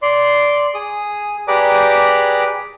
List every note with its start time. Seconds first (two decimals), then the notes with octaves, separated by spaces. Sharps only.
0.02 D5 C6
0.74 G#4 D#6
1.48 G4 G#4 B4 D5 A#5 D6